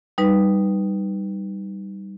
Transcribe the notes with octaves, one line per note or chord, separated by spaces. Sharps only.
G3 D#4 B4